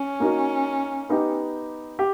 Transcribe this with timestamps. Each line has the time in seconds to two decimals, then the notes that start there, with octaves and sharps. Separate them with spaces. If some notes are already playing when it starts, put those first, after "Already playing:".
Already playing: C#4
0.20 A#3 D#4 F#4 A#4
1.09 B3 D#4 G4
1.99 G4